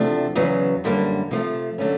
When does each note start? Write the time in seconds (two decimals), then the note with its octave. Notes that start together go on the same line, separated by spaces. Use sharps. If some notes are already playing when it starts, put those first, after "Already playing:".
Already playing: E2 C3 F3 A3 D4
0.35 E2 C#3 F#3 B3
0.84 F#2 D3 G3 A#3
1.31 C3 F3 A3
1.78 D3 F#3 A3 C#4